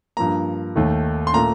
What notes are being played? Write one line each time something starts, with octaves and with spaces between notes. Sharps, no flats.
G2 F3 A#3 A#5
D#2 D#3 A3
C6
A#2 A3 A#5